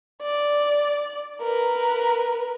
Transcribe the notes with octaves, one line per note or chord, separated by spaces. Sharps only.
D5
A#4 B4